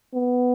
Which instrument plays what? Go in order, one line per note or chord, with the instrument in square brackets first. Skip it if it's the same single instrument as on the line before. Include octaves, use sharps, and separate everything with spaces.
[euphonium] B3